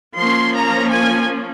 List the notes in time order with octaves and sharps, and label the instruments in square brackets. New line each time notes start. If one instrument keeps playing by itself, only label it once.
[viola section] F3 A#3 C#4 C6
A#5
G#5